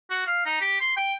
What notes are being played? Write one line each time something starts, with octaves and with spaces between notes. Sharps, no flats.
F#4
F5
D#4
G4
C6
G5